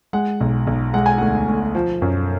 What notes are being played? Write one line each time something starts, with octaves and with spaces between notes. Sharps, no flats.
G#3 F#5
B1
B1
G#3 F#5
G#5
D2 F#5
D2
F3
F#2